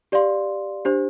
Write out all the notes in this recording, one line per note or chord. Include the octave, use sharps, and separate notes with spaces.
G4 D5 F5 C6
D4 G4 C5